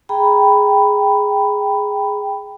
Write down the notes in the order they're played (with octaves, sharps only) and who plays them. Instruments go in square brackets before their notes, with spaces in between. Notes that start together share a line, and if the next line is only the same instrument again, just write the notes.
[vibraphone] G#4 G5 A#5 B5